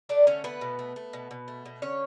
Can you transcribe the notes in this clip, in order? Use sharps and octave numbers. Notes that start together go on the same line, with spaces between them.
A3 D4 D5
D3 C#4 C#5
A3 B3 B4
B2
A3
A3
B2
B2
A3
B2
D3 C#4 C#5